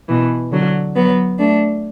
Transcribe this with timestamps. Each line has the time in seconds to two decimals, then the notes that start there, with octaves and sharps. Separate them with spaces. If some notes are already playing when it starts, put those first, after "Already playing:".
0.08 B2 E3
0.51 D3 F#3
0.95 F#3 B3
1.39 A3 D4